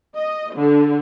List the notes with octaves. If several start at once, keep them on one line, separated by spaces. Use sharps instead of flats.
D#5
D3